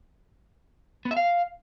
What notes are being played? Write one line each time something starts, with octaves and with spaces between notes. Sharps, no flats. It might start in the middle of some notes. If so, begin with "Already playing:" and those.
B3
E5
F5